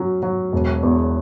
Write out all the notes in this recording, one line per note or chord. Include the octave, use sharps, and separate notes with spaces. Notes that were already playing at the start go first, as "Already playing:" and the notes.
Already playing: F#3 C#4
F#3
E1
E2